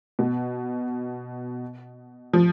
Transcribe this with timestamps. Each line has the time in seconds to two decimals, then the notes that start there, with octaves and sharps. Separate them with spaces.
0.19 B2
2.33 F3